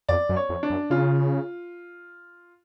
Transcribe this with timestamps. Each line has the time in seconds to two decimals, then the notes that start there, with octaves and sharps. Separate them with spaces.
0.09 F2 D5
0.29 F#2
0.36 C#5
0.49 F2
0.63 D4
0.70 F#2
0.90 C#3 F4